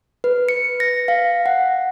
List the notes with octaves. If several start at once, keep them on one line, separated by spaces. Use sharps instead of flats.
B4
C#7
A#6
F5
F#5